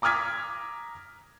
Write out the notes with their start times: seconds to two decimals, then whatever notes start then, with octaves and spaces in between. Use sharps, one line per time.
0.02 A#5 D6 D#6 F6 G#6 B6